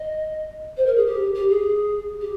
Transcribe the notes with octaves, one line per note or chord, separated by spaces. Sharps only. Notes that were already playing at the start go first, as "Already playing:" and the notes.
Already playing: D#5
C5
A#4
G#4
G4
G4
G#4
G4